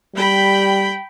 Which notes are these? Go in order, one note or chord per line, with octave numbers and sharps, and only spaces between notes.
G3 G5 B5